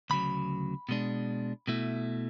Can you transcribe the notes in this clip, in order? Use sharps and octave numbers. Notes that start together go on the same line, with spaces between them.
D2 C#3 F#3 B5
B2 G#3 D4
B2 A3 E4